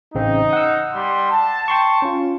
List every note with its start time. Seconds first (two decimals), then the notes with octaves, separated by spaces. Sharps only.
0.15 A1 C#3 C4 D#4
0.53 F#5 E6
0.94 G3 C6
1.31 A5
1.68 G5 C6 C#6
2.02 C#4 F4